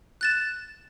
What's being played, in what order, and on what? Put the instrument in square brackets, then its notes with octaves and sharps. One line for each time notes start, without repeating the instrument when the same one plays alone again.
[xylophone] F#6 A6 E7